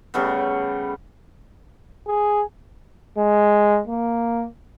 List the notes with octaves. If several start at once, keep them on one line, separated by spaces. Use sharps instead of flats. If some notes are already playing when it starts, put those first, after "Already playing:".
C#3 G3 A3 B3
G#4
G#3
A#3